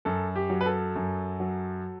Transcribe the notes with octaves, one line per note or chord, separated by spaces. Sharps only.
F#2 A4
G4
F#3
B4
A4
F#2
F#3